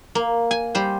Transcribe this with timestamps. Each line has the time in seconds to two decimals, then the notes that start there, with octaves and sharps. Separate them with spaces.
0.15 A#3
0.51 G#5
0.75 G3 C5